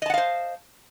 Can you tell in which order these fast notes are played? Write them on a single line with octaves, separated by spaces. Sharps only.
D#5 A5 F#5 F5 C5